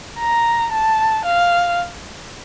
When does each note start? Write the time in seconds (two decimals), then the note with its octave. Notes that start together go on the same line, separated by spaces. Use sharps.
0.19 A#5
0.72 A5
1.25 F5